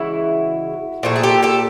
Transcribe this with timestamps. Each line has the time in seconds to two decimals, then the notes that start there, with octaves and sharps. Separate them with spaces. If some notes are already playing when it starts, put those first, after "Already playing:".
Already playing: C#3 E3 G#3 E4 F#4
1.03 A#2 F3 A3
1.16 G#4
1.23 G4 A4
1.43 G4 A4